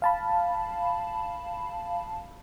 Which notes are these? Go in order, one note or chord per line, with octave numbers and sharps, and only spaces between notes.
F5 A5 B5